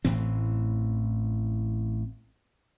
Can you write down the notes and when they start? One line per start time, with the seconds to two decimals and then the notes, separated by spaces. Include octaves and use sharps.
0.05 A1 A2 E3 C4